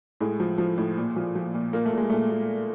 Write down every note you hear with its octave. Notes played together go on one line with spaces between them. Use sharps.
A2 G#3
F3
F3
A2
A#2
F3
F3
A#2
A#2 A#3
A3
A#2 G#3
A#2 A3
A#2